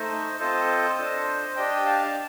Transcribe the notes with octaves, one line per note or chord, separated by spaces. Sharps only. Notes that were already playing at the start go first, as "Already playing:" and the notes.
Already playing: A3 D#4 A4 C5 D#5
C4 F4 A4 C5 D#5
D4 A4
D4 G4 D#5 G5
F5 A5